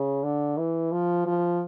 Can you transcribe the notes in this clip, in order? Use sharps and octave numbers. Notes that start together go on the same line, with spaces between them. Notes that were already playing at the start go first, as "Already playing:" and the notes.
Already playing: C#3
D3
E3
F3
F3